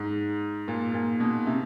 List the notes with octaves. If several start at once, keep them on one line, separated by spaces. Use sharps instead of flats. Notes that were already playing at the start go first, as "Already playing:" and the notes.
Already playing: G#2
A#2
A#2
B2
C3